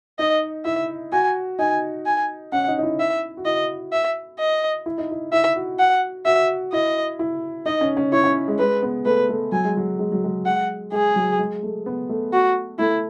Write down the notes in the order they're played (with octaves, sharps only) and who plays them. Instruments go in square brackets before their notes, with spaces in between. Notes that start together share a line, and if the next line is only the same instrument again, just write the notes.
[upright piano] D#4 [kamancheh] D#5
[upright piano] E4 [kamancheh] E5
[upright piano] F#4 [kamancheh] G#5
[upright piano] D#4 [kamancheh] G#5
[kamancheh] G#5
[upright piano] C#4 [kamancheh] F#5
[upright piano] D#4
D#4
E4
[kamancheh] E5
[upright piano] F#4
[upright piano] E4 [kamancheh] D#5
[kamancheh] E5
D#5
[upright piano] E4
D#4
E4
[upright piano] E4 [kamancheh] E5
[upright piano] F#4
[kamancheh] F#5
[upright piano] F#4 [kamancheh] E5
[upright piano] E4 [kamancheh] D#5
[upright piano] E4
[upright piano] D#4 [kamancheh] D#5
[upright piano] C#4
C#4
[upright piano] E4 [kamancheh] C#5
[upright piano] C#4
G#3
[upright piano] G#3 [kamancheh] B4
[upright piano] B3
[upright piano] A3 [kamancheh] B4
[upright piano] A3
[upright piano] F#3 [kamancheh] G#5
[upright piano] G#3
F#3
G#3
F#3
G#3
[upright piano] G#3 [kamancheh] F#5
[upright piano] G#3 [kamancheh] G#4
[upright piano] F#3
G#3
A3
B3
A3
[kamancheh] F#4
[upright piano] A3 [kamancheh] E4